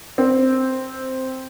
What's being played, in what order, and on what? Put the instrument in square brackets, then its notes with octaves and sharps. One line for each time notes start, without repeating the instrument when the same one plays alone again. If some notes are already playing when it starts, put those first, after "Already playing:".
[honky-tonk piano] C4